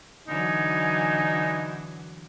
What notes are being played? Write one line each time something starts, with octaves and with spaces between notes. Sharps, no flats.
D3 E3 F#3 D#4 G#5